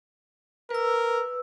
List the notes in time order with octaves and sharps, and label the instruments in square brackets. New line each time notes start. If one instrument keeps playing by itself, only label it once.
[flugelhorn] A#4 [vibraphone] B4 E6